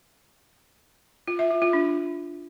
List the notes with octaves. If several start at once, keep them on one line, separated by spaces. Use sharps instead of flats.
F4
E5
F4
F4
D4